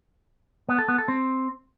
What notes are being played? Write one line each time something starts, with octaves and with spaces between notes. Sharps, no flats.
B3
A4
B3
A4
C4